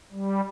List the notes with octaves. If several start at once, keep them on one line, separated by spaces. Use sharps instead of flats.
G3